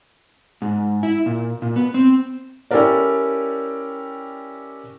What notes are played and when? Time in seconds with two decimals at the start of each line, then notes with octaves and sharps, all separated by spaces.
0.62 G#2
1.03 E4
1.26 A#2
1.62 A#2
1.76 B3
1.94 C4
2.71 C#4 E4 G4 A4 A#4 D5